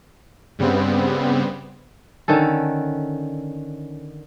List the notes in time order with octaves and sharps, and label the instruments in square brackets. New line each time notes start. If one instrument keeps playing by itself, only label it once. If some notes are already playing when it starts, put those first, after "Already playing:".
[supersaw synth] G2 C#3 G3 B3 C4
[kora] D3 D#3 C#4 A4